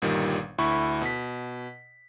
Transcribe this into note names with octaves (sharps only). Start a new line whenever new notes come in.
G1 A#2 D#3 G3
D2 E4 B5 C#6
B2 B6